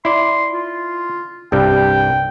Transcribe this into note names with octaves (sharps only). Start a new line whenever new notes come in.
E4 D5 C6
F4
C2 G2 G3 G5